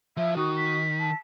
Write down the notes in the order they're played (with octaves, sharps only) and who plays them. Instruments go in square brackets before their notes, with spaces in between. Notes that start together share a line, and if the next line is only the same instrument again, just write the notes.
[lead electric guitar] F3 [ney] E5
[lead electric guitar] D#3 [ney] F#4 [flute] D#6
[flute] B6
[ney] A5